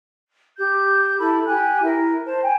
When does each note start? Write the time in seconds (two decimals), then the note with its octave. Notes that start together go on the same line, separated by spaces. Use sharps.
0.58 G4 G6
1.18 E4 A4 B5
1.46 G4 G#5 F#6
1.82 E4 A#4
2.26 C5 A5
2.43 G5 G#5